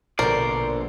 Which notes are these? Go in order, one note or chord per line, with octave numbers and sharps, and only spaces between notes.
A#1 B2 D3 A#4 C5 D5